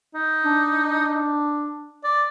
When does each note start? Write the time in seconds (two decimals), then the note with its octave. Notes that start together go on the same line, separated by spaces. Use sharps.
0.15 D#4
0.44 D4
2.04 D5